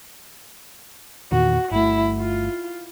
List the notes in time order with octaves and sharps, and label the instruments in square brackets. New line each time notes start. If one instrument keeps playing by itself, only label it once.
[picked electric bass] E2 A#2 D#3 [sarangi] F#4
[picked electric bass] G1 A3 [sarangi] E4
[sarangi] F4